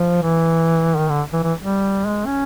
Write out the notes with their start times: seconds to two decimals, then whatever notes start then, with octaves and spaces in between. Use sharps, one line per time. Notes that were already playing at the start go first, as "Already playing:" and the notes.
Already playing: F3
0.23 E3
0.97 D#3
1.09 D3
1.33 E3
1.43 E3
1.61 G3
2.07 G#3
2.26 C#4